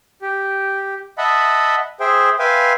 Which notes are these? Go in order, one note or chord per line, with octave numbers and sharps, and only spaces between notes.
G4
D#5 E5 F#5 A5 B5
G#4 C5 E5 G5
B4 E5 F5 G5 G#5 C6